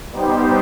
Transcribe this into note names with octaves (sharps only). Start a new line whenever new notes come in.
G3 B3 D#4 G4 C5